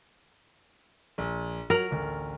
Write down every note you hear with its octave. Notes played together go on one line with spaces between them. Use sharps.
A#1
F#3 A#4 F7 F#7
A1 D2